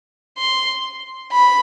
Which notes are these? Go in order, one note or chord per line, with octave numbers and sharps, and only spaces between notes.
C6
B5